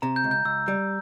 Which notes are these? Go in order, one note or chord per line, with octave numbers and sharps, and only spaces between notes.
C3 A#5
G6
C#2
G6
C#2 E6
G3